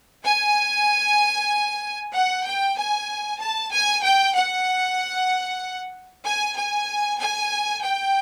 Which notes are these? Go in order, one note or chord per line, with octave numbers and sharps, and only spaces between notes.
G#5
F#5
G5
G#5
A5
G#5
G5
F#5
G#5
G#5
G#5
G5